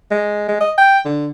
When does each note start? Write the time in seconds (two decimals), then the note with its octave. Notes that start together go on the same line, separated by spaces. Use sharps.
0.11 G#3
0.48 G#3
0.60 D#5
0.78 G5
1.05 D3